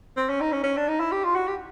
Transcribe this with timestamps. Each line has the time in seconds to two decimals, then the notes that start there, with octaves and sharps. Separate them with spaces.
0.17 C4
0.29 C#4
0.41 D#4
0.52 C#4
0.64 C#4
0.77 D4
0.88 D#4
1.00 E4
1.12 G4
1.24 F4
1.36 F#4
1.48 G4